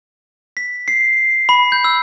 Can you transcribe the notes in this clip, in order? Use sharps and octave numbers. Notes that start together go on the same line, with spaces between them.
B6
C7
B5
G6
E6